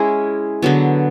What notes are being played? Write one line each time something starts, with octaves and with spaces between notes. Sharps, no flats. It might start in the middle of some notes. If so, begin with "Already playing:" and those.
Already playing: G#3 C#4 E4 G#4
D3 F#3 B3